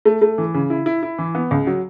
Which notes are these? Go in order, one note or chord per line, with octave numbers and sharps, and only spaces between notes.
A3
A3
E3
C#3
E4
E4
E4
E3
B3
C#2
F#3